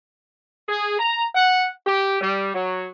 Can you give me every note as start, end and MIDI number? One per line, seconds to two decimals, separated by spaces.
0.68 0.96 68
0.99 1.24 82
1.35 1.70 78
1.87 2.18 67
2.21 2.53 55
2.54 2.87 54